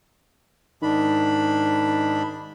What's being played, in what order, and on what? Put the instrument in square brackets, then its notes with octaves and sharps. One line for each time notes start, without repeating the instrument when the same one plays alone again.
[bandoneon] G#2 D4 B5 [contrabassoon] D#3